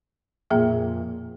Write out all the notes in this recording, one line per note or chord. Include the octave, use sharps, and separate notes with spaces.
F2 A#2 A#3 G#4 E5